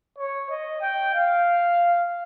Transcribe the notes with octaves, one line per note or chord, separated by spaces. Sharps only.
C#5
D#5
G5
F5